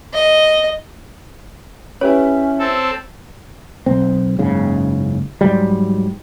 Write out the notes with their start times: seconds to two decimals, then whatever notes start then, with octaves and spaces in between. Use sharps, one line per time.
0.14 D#5
2.01 C#4 E4 G4 B4 C#5
2.59 C4 A4
3.86 B1 C4
4.39 F#1 G#2 C#3
5.41 G#2 F#3 G3